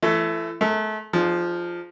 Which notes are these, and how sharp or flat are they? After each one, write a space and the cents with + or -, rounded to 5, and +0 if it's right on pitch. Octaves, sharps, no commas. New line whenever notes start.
E3 +35 A3 +0
A3 -35 A#4 -45
F3 +0 D#4 -45 G#4 +15